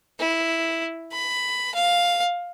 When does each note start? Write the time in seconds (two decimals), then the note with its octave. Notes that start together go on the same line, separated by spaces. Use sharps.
0.20 E4
1.12 B5
1.75 F5